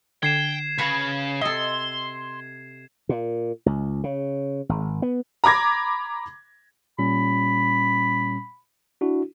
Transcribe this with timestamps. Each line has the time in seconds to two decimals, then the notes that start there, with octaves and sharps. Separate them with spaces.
0.23 D3 G5 G#6 C7 E7
0.78 C#3 F#4 B4 C#5
1.41 C3 A4 D#5 C6
3.09 A#2
3.66 C#2
4.04 C#3
4.69 G#1
5.02 B3
5.44 A#5 B5 D6 G#6 A#6
6.99 A#2 G3 C#4 B5
9.01 D4 E4 F#4